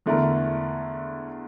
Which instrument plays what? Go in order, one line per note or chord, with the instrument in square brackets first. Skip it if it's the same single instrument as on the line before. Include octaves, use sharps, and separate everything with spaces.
[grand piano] E2 D3 A3 E4 A#4